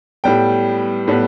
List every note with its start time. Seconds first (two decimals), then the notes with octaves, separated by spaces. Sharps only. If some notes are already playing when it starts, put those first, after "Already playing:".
0.24 A2 G3 B3 G5
1.08 A2 G3 B3